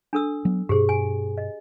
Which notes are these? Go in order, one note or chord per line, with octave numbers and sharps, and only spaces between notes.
D4 A4 E6
F#3 B3
G2 B2 G4 G#4 C5
G#5
D#5